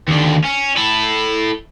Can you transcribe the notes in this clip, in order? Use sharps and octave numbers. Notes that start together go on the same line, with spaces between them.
D#2 D3
C#4
E4 A4